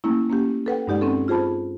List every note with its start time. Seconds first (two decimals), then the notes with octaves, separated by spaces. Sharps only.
0.04 A3 A#3 C#4 E4
0.30 A#3 C#4 G4
0.66 A4 B4 F#5 G5
0.87 G2 G#3 D#4 G4 D5 F#5
1.01 C4 C#4 A4
1.28 F4 G#4 C5 A5 B5